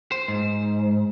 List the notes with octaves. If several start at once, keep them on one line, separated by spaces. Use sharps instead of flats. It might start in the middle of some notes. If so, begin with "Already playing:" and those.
C5
G#2